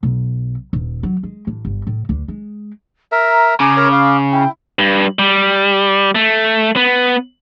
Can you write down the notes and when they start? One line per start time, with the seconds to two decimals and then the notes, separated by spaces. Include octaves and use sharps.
0.03 B1
0.73 D#1
1.03 F#3
1.23 G#3
1.47 A1
1.65 G1
1.87 A2
2.09 D2
2.28 G#3
3.12 A#4 E5 A#5
3.60 C#3 G#5 A#5 D6
3.77 A#4 C#5 A#5
3.92 F5
4.32 E4 G5
4.79 G2
5.19 G3
6.15 A3
6.76 B3